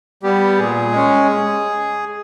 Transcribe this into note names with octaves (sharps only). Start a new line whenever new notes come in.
G3 B3 G4
A#2 G#4
G#3 C#4